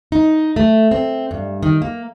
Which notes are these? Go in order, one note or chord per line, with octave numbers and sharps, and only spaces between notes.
D#4
A3
C4
G2
D#3
A#3